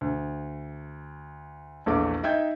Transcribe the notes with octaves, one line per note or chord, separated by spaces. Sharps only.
D2
A#1 E2 A3 D6
D#4 E5 G5 G6 G#6